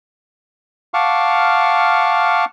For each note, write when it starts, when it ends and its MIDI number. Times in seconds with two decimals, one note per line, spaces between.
0.94 2.45 77
0.94 2.45 78
0.94 2.45 81
0.94 2.45 85
0.94 2.45 86
0.94 2.45 89